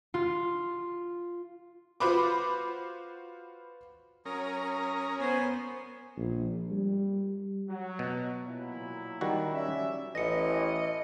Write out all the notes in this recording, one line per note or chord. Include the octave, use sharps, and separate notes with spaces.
F4
F4 F#4 B4 C5 B5 D6
F#3 C#4 A#4 D#6
B3 C5 C#5 G#5
A#1
G3
F#3
B2
A#2 F#3 E4
D#3 G3 F#4
C#4 D5 E5
A1 E3 D#5 A#6 C#7